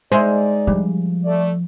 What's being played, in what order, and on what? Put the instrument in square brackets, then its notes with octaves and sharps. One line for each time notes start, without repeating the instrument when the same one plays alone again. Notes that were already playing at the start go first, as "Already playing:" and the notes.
[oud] G#3 [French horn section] D#4 D5 [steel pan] C5 E5
[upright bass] F3 [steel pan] G3
[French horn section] A3 D5